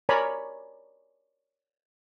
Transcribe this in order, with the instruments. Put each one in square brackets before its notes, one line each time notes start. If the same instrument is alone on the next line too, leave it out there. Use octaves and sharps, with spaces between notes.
[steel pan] A#4 C#5 D5 G#5 A#5 B5